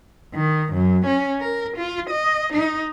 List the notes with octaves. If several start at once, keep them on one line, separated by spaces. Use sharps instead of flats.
D#3
F#2
C#4
A#4
F4
D#5
D#4